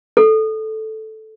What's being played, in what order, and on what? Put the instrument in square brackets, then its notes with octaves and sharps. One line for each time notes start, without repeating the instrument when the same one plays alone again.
[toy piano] A4